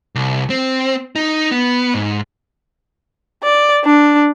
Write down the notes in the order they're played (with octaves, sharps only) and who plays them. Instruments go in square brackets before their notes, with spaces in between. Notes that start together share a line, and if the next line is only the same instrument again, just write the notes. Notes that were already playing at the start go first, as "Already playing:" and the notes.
[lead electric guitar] C2
C4
D#4
B3
G#2
[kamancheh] D5
D4